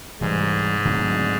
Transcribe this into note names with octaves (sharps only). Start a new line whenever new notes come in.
G#2 C3 E3 G3
D3 F#3 A3 C4